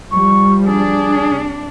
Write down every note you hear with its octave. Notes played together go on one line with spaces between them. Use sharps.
F3 G3 C#6
D4 G#4
C3